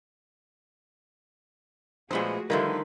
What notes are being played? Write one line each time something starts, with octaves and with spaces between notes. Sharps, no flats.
A#2 F3 G#3 A3 B3 F#4 G#4 C5
D3 D#3 F3 G3 A3 A#3 E4 B4